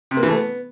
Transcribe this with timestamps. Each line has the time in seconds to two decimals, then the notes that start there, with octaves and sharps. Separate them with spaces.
0.11 C3
0.17 A#3
0.23 E3
0.29 A3
0.35 B3